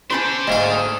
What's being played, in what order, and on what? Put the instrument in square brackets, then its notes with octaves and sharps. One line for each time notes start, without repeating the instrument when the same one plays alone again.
[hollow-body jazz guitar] C#4 B5 C6 [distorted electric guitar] D4 A4 [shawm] C5
[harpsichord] D2 G#2 F5 [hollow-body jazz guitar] A#3 D#5
[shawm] G#4